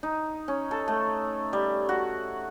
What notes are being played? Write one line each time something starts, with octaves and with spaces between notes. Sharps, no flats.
D#4
C#4
A4
A3
G3
F#4